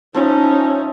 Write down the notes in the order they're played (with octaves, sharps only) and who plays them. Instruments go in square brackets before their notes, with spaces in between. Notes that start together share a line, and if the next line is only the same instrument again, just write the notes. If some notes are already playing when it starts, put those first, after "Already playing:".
[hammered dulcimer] F3 E4 D#5 [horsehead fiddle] C#4 D#4